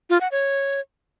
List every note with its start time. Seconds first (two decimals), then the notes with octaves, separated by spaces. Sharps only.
0.10 F4
0.21 F#5
0.32 C#5